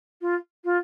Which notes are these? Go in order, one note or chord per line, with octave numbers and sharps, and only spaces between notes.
F4
F4